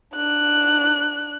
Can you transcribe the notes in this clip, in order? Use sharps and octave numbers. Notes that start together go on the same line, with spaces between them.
D4 F#6